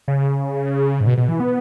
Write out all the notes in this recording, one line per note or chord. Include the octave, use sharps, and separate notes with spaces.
C#3
G#2
B2
B2
E3
B3